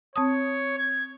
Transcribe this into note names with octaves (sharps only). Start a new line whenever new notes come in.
C4 C#5 A5 D#6
G#6